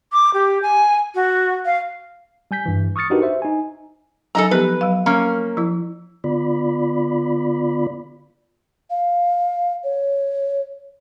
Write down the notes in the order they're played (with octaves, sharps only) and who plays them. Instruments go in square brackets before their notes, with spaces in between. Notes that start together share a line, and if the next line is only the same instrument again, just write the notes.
[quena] D6
G4
G#5
F#4
F5
[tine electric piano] G3 G#5 G6 B6
G2 E3
C#6 D#6 F6 A6 C#7
D4 D#4 F#4 G4 A#4 B4
C5 E5
D#4 G#5
[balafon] F#3 D#4 G#5 [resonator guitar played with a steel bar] A4 D#5 A#5
[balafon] F3 B3 G4 [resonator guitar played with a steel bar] B4
[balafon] F#3 F5
[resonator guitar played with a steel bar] A#3 C#4
[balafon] F3 E4
[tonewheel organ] D3 B3 F4 D5 B5
[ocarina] F5
C#5